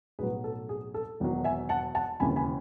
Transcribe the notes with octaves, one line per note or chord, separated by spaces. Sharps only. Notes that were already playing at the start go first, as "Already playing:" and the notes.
B1 A2 F#3 G#4 B4
A4
G#4
A4
E1 E2 D#3 F#3
E5 G#5
F#5 A5
F#5 A5
E1 D#2 C#3 E3 G#5 B5
G#5 B5